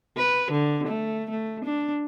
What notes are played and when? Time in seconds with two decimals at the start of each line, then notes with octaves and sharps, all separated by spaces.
0.17 B4
0.51 D3
0.87 A3
1.30 A3
1.64 D4